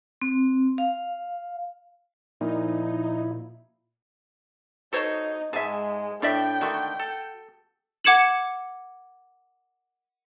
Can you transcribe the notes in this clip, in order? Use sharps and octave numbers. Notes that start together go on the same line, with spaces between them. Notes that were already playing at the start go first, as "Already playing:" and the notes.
C4
F5
A#2 F3 D#4 E4
D#4 F#4 A4 C5 C#5
G#2 G#3 G#4 E5 A5
A2 D4 D5 E5 G5
D3 D#3 A3 F#4
A4
F#5 D6 G#6 C#7 E7 F#7